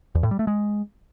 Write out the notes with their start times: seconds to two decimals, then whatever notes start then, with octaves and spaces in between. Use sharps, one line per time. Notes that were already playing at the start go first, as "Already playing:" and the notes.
0.15 E2
0.23 A2
0.31 G3
0.39 A3
0.47 G#3